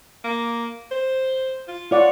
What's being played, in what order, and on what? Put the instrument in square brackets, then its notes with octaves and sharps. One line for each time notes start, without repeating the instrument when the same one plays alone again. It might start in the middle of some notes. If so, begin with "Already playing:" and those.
[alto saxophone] A#3
C5
F4
[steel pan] F4 D5 F#5 [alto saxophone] C#5